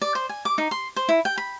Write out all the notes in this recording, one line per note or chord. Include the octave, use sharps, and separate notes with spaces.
D5
C5
G#5
D6
D#4
C6
C5
E4
G5
B5